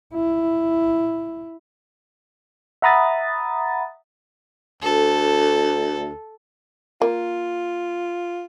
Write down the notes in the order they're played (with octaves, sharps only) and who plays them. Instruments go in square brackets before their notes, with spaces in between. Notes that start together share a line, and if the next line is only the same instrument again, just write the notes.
[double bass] E4
[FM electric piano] E5 F#5 A#5 B5 D#6 A6
[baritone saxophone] D2 [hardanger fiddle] A4
[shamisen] A#3 [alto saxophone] F4